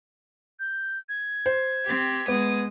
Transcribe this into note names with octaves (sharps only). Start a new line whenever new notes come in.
G6
G#6
C5
C4 G4
G#3 B3 D#6